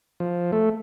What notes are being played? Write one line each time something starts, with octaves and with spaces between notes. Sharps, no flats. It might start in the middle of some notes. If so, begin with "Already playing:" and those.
F3
A3